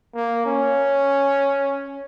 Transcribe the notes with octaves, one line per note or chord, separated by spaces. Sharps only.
A#3
C#4